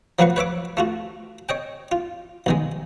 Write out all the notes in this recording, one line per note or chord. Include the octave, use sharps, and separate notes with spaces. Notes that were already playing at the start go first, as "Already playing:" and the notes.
F3 F#3 A#3 F#4 B4 C#6
B4 C#5 E5 D6
A3 F4 F#4
C#5 D#5 G5
F4
B1 D#3 G#3